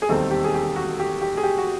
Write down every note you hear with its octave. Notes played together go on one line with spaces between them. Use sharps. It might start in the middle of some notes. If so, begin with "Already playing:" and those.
G#4
E1 D#2 D#3 G3 C4 A4
G4
G#4
G4
F#4
G4
G4
G#4
G4
F#4